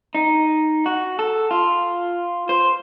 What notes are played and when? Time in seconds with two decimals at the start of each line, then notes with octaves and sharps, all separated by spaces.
0.15 D#4
0.86 F#4
1.19 A4
1.51 F4
2.49 C5